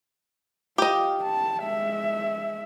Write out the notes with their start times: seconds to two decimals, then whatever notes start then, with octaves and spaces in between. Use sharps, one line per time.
0.78 F4 G4 D#5
1.24 A5
1.61 G#3 E5